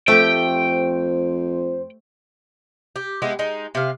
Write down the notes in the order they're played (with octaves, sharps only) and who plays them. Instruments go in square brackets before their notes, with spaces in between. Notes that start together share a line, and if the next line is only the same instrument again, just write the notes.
[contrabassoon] F2 [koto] A3 G4 [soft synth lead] C5 [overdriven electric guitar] G5
[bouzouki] G4
G#3 B3 E4 G4
G#3 D#4
C3 F5